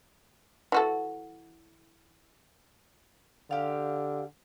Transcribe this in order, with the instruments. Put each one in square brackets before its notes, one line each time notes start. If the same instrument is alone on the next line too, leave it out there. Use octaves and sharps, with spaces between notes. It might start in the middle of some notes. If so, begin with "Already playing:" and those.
[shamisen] E3 F#4 A4
[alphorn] D3 [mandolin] G4 F5